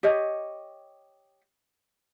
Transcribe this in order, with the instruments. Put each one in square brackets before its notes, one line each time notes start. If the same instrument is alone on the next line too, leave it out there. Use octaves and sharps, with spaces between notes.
[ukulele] G4 C#5 D#5